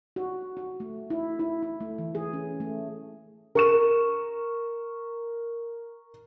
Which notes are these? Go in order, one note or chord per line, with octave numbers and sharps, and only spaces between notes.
F#4
F#4
A3
E4
E4
E4
A3
E3
G#4
C#4
A3
A#4 C#6 E7